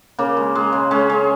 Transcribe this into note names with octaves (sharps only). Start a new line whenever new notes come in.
C#3 A#3
G#3
G#3
C#3
G#3 C#4
G#3